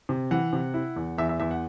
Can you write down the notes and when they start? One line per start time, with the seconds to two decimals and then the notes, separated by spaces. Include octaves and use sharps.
0.09 C3
0.31 E3 F#5
0.53 C3
0.74 E4
0.96 E2
1.18 E2 E5
1.29 E5
1.40 E2 E5
1.51 F#5